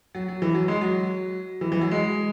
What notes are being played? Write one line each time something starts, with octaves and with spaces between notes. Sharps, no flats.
F#3
F#3
E3
F#3
G#3
F#3
E3
E3
F#3
G#3